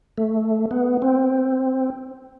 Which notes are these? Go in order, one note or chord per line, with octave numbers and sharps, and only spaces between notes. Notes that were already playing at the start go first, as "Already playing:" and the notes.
A3
B3
C4